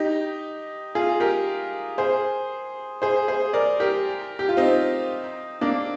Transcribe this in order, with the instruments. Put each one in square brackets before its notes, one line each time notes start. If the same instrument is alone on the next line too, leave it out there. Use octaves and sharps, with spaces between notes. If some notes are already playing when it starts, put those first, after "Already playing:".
Already playing: [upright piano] D#4 G4
F4 G#4
G4 A#4
G#4 C5
G#4 C5
G#4 C5
A#4 D5
G4 A#4
G4
F4
C4 D#4
A#3 D4